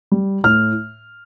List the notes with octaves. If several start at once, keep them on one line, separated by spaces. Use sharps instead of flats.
G3
A2 F6